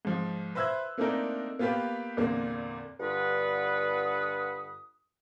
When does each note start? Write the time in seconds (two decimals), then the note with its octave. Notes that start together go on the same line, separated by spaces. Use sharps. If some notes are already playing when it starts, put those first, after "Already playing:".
0.05 G#2 F3
0.55 B4 C5 E5 E6 F#6 G#6
0.98 A3 A#3 C4 D4 D#4 A#4
1.59 A#3 B3 F4 G4 B4
2.17 E2 A#2 D3 A#3 C4
2.99 G2 D3 F4 B4 F#5 D#6